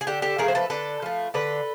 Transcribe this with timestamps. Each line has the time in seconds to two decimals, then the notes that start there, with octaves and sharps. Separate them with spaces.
0.01 G#4
0.07 D3 G4 A4
0.22 G4 A4
0.38 F3 A3 G#4 A#4
0.48 C5
0.55 A4 B4
0.70 D3 A4 B4
1.02 F3 A3
1.34 D3 A4 B4